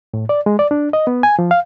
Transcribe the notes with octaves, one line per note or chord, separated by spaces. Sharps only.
A2
D5
G#3
D5
D4
D#5
B3
G#5
F3
F5